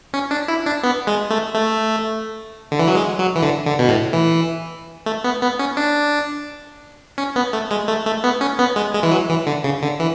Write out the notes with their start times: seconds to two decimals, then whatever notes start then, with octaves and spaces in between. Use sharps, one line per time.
0.14 C#4
0.31 D4
0.48 E4
0.66 D4
0.83 B3
1.07 G#3
1.30 A3
1.54 A3
2.72 D3
2.79 E3
2.88 F#3
2.95 G#3
3.19 F#3
3.36 E3
3.42 D3
3.66 D3
3.79 B2
3.89 A2
4.13 E3
5.06 A3
5.24 B3
5.42 B3
5.59 C#4
5.77 D4
7.18 C#4
7.36 B3
7.53 A3
7.71 G#3
7.88 A3
8.06 A3
8.24 B3
8.41 C#4
8.59 B3
8.76 G#3
8.94 G#3
9.03 E3
9.11 F#3
9.29 E3
9.47 D3
9.64 C#3
9.83 D3
10.00 E3